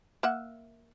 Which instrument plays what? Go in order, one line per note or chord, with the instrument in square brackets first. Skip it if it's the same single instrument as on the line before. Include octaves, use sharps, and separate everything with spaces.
[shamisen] A#3 E5 F#5